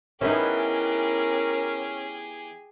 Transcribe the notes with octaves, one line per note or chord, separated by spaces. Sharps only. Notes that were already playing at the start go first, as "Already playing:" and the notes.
E3 B3 C#4 D#4 G4 G#4 A#4